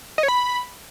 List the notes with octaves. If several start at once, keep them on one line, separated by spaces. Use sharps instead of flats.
D#5
C#5
B5